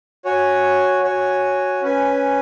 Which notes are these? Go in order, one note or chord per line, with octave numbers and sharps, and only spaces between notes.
F#4 C#5 G#5
F#4 C#5 G#5
C#4 B4 G#5